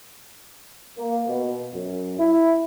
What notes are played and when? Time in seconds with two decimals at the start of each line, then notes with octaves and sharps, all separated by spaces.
0.98 A#3
1.28 B2
1.75 F#2
2.19 E4